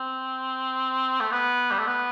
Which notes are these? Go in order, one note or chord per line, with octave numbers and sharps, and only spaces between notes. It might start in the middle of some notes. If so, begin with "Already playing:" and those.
Already playing: C4
A3
B3
G3
A3
B3